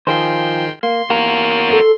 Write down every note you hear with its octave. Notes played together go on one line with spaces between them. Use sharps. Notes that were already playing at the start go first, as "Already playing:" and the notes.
D#3 F3 G#4 C5 G5 C6
A#3 C6
E2 A#3 F#4 A#4
A4